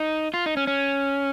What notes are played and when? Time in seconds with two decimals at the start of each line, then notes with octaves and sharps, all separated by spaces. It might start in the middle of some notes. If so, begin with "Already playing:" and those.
Already playing: D#4
0.34 F4
0.46 D#4
0.57 C#4
0.67 C#4